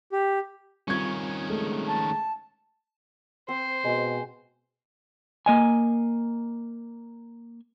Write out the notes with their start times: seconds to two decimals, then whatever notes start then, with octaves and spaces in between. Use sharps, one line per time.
0.12 G4
0.88 D#3 G3 C4 C#4 F4 C#6 G#6
1.49 G#3 A3
1.87 A5
3.49 C4 C5
3.84 B2 G#3
5.46 A#3 D#5 G#5